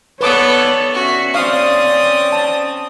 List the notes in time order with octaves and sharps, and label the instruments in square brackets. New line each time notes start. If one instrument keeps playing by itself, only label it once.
[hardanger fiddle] B3 A4 [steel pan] B4 D6 D#6 [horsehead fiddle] C#5 D5
[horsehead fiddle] C#4 E5 [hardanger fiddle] F#4
[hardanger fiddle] C4 D#6 [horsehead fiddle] C#4 D5 [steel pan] F5 C#6
[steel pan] A5